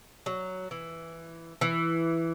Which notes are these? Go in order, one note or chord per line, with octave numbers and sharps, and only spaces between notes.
F#3
E3
E3